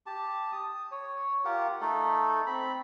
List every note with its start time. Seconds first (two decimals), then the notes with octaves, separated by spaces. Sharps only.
0.06 G4 A5
0.52 D#6
0.91 C#5
1.45 F4 G4 A#4 F#5
1.81 A3 D#4 A4
2.46 C4 B5